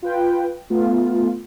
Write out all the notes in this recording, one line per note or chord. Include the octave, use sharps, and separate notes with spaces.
F4 B4 G5
A3 B3 F4